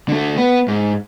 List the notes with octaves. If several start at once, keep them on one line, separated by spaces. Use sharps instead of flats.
D3 A3
B3 B4
G#2